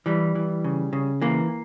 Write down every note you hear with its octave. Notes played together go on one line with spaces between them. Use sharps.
E3 G3
E3
C#3
C#3
E3 A#3